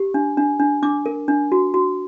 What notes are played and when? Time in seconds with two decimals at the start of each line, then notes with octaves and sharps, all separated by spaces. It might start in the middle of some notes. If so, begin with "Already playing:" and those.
Already playing: G4
0.14 D4
0.37 D4
0.60 D4
0.82 D4 D6
1.06 A#4
1.28 D4
1.52 F#4
1.74 F#4